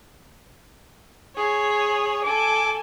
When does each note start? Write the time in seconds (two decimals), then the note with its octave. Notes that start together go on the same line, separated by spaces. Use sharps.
1.36 G#4 C#5
2.24 A4 G#5 D6